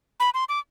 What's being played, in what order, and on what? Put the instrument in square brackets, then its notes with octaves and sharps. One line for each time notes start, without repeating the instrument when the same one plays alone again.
[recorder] B5
C6
D6